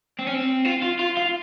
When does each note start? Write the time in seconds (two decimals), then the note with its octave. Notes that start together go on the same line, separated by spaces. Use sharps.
0.19 C4
0.27 C#4
0.34 C4
0.65 F4
0.82 F4
0.99 F4
1.17 F4